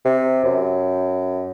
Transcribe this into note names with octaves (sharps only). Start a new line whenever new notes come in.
C3
F#2